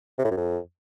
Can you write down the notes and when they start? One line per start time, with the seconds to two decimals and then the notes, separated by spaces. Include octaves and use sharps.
0.19 C3
0.25 A2
0.31 F#2
0.37 F2